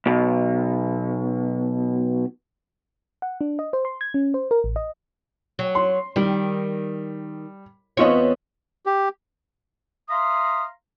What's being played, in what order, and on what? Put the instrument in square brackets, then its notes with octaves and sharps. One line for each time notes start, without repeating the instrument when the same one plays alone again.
[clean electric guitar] B1 B2
[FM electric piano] F#5
D4
D#5
C5
C6
G#6
C#4
C5
A#4
A1
D#5
[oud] F#3
[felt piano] C6
[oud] D#3 [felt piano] G3
[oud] E2 B3 C#5 [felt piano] C4 F4 D#5
[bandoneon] G4
[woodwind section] E5 F5 A#5 C6 D#6